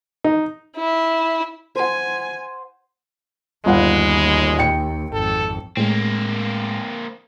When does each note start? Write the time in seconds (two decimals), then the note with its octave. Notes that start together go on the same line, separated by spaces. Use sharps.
0.24 D#4
0.77 E4
1.76 C5 F#5 G#5
3.66 G1 D#2 G#3 F5 F#5
4.59 G5 C#7
5.13 G#1 F2 A4
5.77 A2 G#3 A#3 C4